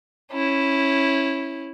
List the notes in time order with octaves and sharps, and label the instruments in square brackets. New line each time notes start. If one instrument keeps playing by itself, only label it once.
[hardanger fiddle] C#4 E4